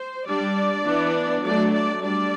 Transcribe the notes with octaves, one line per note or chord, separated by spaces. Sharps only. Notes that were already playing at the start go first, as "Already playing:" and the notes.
Already playing: C5
G3 D4 D5
E3 B3 D4
F#3 A3 D4 D5
D5
G3 D4 D5